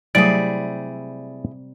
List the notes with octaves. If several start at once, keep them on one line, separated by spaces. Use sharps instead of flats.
C3 F#3 G3 A3 E4 G4 G#4 D5